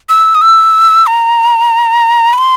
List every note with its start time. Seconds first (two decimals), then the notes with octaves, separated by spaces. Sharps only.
0.09 E6
0.35 D#6
0.41 E6
1.07 A#5
2.33 B5
2.38 C6